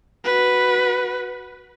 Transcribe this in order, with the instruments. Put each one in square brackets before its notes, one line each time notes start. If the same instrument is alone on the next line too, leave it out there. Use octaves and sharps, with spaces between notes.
[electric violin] F#4 B4